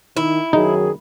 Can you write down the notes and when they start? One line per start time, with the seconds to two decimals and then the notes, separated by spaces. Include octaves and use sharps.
0.17 D#3 E4
0.53 F#2 D#3 F#3 D#4 G#4